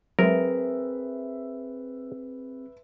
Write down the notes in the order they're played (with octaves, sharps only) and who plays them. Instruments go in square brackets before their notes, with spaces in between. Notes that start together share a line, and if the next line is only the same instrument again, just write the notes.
[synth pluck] F#3 G#3 [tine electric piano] C4 G#4 [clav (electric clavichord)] A#4 [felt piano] B4 E5